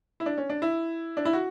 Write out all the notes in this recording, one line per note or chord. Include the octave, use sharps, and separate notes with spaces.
E4
D4
C#4
D4
E4
D4
E4
F#4